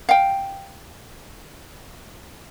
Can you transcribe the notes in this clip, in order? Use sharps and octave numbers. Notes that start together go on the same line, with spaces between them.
F5 G5